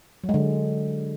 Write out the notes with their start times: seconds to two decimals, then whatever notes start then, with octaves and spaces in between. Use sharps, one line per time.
0.24 F#3
0.29 G#3
0.34 D3